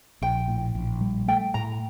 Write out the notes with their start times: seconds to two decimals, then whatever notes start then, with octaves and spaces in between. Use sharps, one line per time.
0.22 A#1 G5
0.48 A2
0.75 A#1
1.01 G3
1.28 A3 G5
1.54 A2 A#5